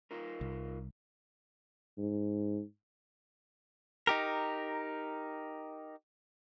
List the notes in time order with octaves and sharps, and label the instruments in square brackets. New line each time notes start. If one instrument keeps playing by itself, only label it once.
[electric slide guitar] D#4 F4 A#4
[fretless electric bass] C2
[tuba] G#2
[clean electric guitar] D#4 G4 A#4